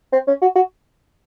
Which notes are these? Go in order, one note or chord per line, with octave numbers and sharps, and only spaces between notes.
C4
C#4
F#4
F#4